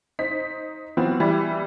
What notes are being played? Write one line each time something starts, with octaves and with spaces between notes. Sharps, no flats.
D#4 C5 B6
E3 F#3 B3 C4 F4
E3 G3 E4